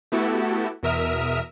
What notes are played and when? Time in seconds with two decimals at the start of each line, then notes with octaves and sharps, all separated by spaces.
0.12 A3 B3 E4 F#4 G4 A4
0.83 E2 B2 A#4 E5 D#6 F6